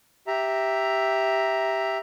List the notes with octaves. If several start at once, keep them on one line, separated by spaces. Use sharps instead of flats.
G4 E5 A#5